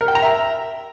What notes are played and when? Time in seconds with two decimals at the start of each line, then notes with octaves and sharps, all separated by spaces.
0.01 A#4
0.08 G5
0.15 A#5
0.22 E5